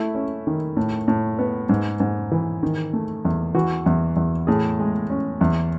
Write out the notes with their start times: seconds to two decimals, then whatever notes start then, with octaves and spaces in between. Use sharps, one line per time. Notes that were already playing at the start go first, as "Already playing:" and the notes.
Already playing: A3 E4
0.15 C#4
0.47 D#3
0.77 A2
1.08 A2
1.39 B3
1.69 G#2
2.00 G#2
2.31 E3
2.63 D#3
2.93 A3
3.25 E2
3.54 E3 F#4
3.86 E2
4.16 E2
4.47 A2 G#4
4.79 G#3
5.10 C#4
5.41 E2